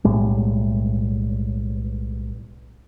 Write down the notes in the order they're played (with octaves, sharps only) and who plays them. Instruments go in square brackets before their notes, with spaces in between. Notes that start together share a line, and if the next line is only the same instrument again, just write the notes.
[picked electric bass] B1 A2 G3 G#3